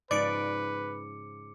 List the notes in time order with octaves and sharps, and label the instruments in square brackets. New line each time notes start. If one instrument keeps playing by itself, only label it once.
[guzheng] G#2 C#3 F3 [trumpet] B4 [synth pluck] D5 D7 [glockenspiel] D6 C#7